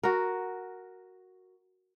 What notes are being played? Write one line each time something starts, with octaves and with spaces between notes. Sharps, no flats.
F#4 A#4